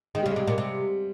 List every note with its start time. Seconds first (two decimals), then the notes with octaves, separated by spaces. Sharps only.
0.15 D#3 G#3
0.23 G3
0.26 C#3
0.31 G#3
0.36 C3
0.47 A#2
0.58 C3